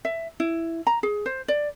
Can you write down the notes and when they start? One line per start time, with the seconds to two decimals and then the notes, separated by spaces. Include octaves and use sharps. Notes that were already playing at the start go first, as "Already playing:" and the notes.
0.05 E5
0.40 E4
0.87 A#5
1.03 G#4
1.26 C5
1.48 D5